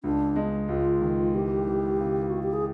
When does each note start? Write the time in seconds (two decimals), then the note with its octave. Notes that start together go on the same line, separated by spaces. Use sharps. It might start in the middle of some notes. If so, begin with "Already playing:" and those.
0.04 C#2 D4
0.36 G#3
0.69 C#2 F4
1.01 D#3
1.35 E3 G4
1.67 E3
2.00 C#3
2.30 E3 F#4
2.43 G4
2.53 G#4